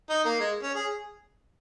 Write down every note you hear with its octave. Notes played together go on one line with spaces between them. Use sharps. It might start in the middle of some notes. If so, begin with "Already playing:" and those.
D#4
A#3
G#3
C#4
G#4